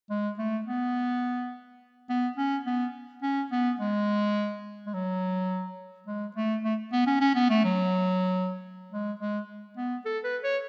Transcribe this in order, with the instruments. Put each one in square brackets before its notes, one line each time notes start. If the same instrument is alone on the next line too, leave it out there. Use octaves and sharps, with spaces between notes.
[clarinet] G#3
A3
B3
B3
C#4
B3
C#4
B3
G#3
G#3
F#3
G#3
A3
A3
B3
C#4
C#4
B3
A3
F#3
G#3
G#3
B3
A4
B4
C#5